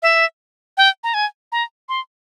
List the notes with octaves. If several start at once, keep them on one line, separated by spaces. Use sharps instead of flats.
E5
G5
A#5
G#5
A#5
C6